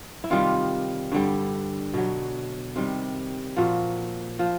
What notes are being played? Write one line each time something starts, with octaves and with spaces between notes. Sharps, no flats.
E4
C3 D#3 G3 F4
G2 D3 G3
B2 F#3
C3 D#3 G3
A#2 F3 F#4
F3